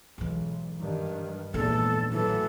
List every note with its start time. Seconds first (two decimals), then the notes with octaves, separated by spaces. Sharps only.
0.18 B1 G#2 E3
0.81 G2 D#3
1.54 A#1 E2 G#2 D4 A4
2.12 A2 E3 F#3 A4